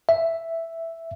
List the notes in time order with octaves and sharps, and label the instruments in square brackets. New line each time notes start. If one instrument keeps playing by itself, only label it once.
[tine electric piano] E5